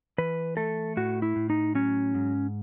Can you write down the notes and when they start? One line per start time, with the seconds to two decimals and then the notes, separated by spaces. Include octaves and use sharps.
0.18 E3 B4
0.57 A3 A4
0.97 A2 F#4
1.22 E4
1.36 A2
1.50 D#4
1.75 F#3 C#4
2.15 G#2